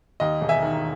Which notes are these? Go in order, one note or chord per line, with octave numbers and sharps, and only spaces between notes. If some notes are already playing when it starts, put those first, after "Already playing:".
D#2 D#5
E1
E5 G#5
D#3